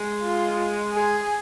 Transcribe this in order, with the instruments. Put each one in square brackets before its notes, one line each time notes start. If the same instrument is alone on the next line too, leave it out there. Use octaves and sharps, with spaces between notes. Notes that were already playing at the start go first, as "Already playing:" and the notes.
Already playing: [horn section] G#3
[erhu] F4
G#4